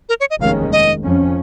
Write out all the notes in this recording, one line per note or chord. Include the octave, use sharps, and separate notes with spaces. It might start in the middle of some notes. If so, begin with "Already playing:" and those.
A#4
C#5
D#5
F1 D#2 D#3 G#3 C#4 F5
D#5
F2 F3 C#4